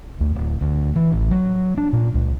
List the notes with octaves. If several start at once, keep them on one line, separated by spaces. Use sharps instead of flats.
D2
D1
D2
E3
A1
F#3
D4
A#2
C#2